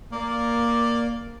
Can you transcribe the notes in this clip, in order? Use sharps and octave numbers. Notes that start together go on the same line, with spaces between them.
A#3 D5